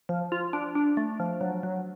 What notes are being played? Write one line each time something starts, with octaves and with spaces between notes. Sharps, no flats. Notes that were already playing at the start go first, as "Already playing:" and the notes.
F3
F4
D4
D4
A3
F3
F#3
F#3